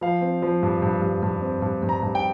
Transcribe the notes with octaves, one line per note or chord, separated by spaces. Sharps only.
F3 F5
C4
F3
G2
G2
G2
G2
C4
G2
G2
A#5
G2
G5